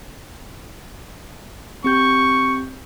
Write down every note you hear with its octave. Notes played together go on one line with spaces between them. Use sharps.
C4 G4 C#6 G6